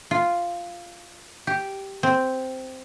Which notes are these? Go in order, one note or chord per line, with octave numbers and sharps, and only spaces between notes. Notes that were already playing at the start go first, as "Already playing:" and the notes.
F4
G4
C4